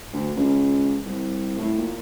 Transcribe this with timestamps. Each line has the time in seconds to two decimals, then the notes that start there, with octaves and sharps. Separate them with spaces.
0.13 D2
0.36 C#2
1.06 C2
1.58 A2
1.78 A#2